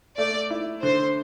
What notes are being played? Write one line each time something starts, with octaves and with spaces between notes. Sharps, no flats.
A3 D5
E4
D3 C5